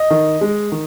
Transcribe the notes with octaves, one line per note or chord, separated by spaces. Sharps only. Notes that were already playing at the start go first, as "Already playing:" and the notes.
Already playing: D#5
D#3
G#3
D#3